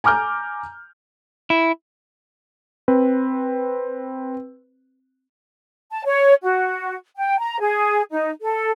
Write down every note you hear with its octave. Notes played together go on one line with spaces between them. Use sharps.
G#5 A#5 D6 F6 G6
E4
C4 B4
A5
C#5
F#4
G5
A#5
G#4
D#4
A4